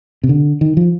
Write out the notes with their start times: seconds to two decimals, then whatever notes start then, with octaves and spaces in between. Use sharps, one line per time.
0.24 C3
0.29 D3
0.61 D#3
0.77 F3